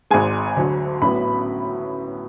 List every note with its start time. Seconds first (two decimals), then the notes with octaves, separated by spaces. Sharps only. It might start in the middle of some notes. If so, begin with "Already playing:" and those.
0.11 G#1 G#2 G#3 G#5
0.57 D2 D3 F#3
1.02 A1 A2 F#3 B3 B5